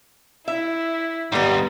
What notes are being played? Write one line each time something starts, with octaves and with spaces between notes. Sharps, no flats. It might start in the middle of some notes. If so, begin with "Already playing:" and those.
E4 E5
D#2 G#2 D3 D#3 G3 B3